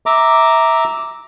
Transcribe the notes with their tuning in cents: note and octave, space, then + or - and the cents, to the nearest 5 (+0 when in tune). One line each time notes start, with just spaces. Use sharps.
E5 -15 A#5 +0 D6 +0